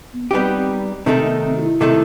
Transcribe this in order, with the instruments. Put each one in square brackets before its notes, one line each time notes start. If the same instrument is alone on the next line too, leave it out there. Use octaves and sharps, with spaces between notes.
[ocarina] B3
[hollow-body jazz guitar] G3 B3 D#4 G4 [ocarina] C4
[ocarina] C4
[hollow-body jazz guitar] C3 D#3 A3 D#4 A4 [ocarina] C4
[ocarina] B3
C4
F#4
E4
[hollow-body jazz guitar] C3 D#3 A3 D#4 A4